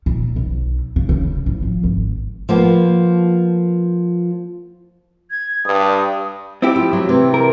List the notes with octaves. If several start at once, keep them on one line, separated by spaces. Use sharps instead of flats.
A#2
B1
C#3
C#3
A1
F3
G#1
F3 A#3 B3
G#6
G2 D#6
C4 E4 G4
F3
F#3
C3 E3
A#4